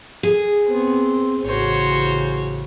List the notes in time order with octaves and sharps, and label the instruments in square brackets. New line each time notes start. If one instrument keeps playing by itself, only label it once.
[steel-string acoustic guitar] G#4
[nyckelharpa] B3 [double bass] C4
[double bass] A1 C#3 [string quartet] F#4 C#5 [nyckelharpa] C5